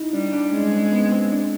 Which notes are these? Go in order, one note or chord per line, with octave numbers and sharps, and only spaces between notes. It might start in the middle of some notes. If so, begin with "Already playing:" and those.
Already playing: D#4 E4
G3 D4
D4
G#3 C#4
C4
B3
C4
D4